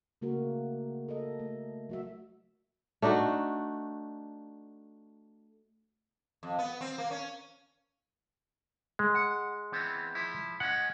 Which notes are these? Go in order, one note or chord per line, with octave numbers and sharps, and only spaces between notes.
C#3 A3 A#3 F#4 A#4
A4 A#4 D#5
A3
F#3 F#4 E5
A3 D4 D#4 F#4
F2
B3
C4
A#3
C#4
G#3
F#5
E3 B3 C4
F3 E4
G#3 C#4 F#5